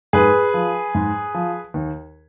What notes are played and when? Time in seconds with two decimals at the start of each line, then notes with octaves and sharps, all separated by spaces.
0.13 G#2 G#4 B4
0.54 F3
0.95 G#2
1.35 F3
1.74 D#2